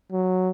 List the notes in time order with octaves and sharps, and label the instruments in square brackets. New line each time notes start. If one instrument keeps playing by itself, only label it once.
[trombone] F#3